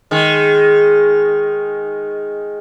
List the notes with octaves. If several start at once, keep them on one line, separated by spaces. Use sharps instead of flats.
D#3 G#3